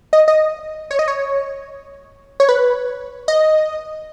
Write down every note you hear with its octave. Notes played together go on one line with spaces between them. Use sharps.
D#5
D#5
C#5
D#5
C#5
C#5
B4
D#5